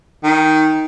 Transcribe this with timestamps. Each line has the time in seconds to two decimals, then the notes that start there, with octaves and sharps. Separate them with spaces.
0.24 D#3